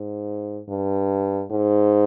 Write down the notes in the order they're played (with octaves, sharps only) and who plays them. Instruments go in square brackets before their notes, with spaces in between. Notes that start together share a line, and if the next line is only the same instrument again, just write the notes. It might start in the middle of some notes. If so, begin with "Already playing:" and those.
Already playing: [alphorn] G#2
G2
G#2